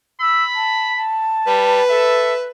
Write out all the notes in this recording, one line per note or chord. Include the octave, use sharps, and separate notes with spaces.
B5 E6
A5
A5
G3 B4
A4 E5